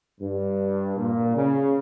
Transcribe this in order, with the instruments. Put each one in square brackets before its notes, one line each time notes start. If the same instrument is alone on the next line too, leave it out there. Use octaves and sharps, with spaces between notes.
[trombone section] G2
A#2
C#3